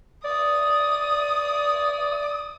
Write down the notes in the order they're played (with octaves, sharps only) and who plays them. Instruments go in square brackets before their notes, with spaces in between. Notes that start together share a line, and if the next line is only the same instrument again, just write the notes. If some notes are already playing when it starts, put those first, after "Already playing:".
[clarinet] D5 [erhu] D#6